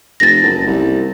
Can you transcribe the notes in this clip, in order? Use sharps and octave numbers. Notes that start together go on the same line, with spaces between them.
F1 A6 A#6
F#1
C2